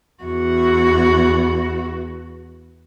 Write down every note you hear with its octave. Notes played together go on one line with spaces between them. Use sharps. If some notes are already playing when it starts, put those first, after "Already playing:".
E2 F#4